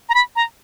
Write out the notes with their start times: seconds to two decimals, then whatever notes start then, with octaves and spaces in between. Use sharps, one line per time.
0.09 A#5
0.14 B5
0.36 A#5